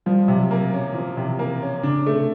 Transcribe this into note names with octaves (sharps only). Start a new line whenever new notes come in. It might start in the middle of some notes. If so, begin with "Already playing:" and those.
F3 G3
C3
F#3
A#3
F#3
C#4
D#3
E3 F3
C3
E3
A#3
C#4
C#3 D4
A3
C3